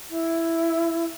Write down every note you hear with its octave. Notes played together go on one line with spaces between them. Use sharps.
E4